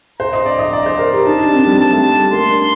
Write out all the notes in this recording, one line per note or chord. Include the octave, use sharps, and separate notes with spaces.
C5 A#5
D#5
D5
D#5
D5
C5
A#4
G4
D#4 A5
D4
C4
G3
G3 A5
A3
G3
A#3 C6
D4